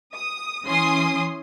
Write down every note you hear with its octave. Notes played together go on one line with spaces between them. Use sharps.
D#6
E3 C#4 G#5 C6 D#6